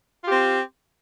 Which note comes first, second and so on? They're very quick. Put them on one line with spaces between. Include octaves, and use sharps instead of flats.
F4 G4 C4